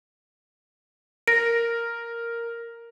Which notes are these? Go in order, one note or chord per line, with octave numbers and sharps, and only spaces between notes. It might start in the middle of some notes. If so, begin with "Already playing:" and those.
A#4 A#6 D7